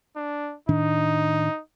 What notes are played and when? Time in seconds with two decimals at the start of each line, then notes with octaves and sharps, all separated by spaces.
0.16 D4
0.69 A2 D#3 D4 D#4